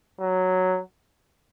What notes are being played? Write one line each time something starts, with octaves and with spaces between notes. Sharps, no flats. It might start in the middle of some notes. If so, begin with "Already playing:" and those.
F#3